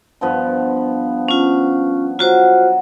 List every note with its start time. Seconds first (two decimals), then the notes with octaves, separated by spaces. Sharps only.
0.21 G2 F3 B3
1.28 C#4 F4
2.19 F#3 F4 F#4 C5